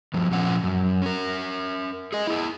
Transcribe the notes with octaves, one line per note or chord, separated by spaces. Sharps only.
G2 F3
A#2 F3 C#4 F#5
F#2
C#4 A#4
G#4 D#5
E4 G#4